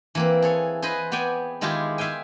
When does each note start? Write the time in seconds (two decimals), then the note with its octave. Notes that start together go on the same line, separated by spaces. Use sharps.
0.15 E3 A#3 C4
0.42 G#4 A4 C#5
0.82 G#4 B4 C5 D#5 B5
1.12 B3 G#4 D5 G5 G#5
1.61 D#3 G#3 E4 F4 G4 G#4
1.98 G#4 E5 F5 G5 G#5